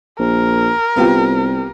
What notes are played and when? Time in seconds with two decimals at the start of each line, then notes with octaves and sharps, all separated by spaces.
0.19 A#1 A#4
0.96 C2 B3 F4 G4